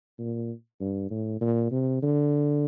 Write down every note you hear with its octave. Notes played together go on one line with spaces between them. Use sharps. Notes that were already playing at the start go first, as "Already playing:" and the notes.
A#2
G2
A2
A#2
C3
D3